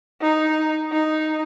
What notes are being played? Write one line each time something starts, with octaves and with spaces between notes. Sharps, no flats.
D#4
D#4